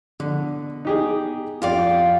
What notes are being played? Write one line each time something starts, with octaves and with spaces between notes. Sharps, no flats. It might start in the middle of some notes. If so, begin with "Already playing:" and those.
B2 D3
D#4 G4 G#4
F2 F4 G4 D5 F5 G5